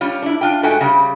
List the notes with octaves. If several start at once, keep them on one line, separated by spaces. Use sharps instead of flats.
G3 C#4 F4
D4 E4
D4 F4 G5
G#2 A3 F#4 G5 G#5
C#3 G3